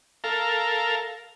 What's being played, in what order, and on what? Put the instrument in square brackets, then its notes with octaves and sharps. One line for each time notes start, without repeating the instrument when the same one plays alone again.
[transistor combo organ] A4 A#4 F5